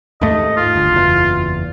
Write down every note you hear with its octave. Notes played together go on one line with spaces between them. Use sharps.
D#2 G#2 A3 D#5
F4
G1
F#1 E2